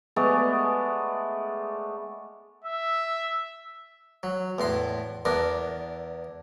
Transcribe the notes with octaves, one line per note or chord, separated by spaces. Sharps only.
G#3 A3 B3 D5
E5 E6
F#3
E2 A2 C6
E2 D4 A#4